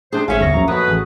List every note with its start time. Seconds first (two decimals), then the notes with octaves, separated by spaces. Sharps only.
0.13 C3 D4 G#4 C5
0.28 G#1 C#4 G#4 E5 F5
0.41 G1 D#2 G#2 F#3 C#6 A#6
0.54 A#1 F#2 A#5
0.68 F2 F#3 A#3 F#4 B4 D#6
0.88 A1 G#4